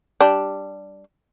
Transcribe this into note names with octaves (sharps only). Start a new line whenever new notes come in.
G3 D4